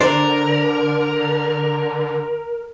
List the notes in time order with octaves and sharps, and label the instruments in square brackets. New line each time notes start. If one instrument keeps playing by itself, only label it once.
[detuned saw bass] D3 [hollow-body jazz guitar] D4 C5 [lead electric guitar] A#4 [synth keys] D5